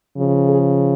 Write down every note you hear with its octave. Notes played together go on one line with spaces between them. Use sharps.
C#3 F3
G#4